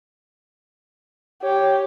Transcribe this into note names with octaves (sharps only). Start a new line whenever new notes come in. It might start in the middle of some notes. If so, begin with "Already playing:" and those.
G4 C#5